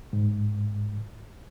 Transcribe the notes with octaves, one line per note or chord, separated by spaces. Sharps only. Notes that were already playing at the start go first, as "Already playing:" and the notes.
G#2